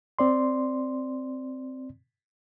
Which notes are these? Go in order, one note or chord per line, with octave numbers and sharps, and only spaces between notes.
C4 D5 C6